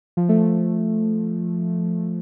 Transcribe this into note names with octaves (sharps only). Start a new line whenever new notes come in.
F3
A3